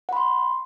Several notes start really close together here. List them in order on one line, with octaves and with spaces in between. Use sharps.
F#5 B5 C6